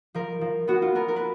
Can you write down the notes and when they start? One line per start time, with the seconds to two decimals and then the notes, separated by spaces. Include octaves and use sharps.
0.14 F3 A#4
0.41 F3
0.68 B3 F#4
0.82 F4
0.95 B3 A#4
1.08 A#4
1.16 B4